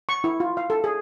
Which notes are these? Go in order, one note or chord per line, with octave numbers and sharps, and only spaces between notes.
C#6
E4
F4
F5
A4
G#4